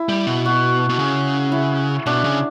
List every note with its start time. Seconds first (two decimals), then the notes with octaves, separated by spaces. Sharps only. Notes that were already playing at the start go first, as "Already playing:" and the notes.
Already playing: E4
0.09 G3
0.26 B2
0.46 F#4
0.89 B2
0.99 C#3
1.52 E4
2.06 B2 D4
2.24 C#3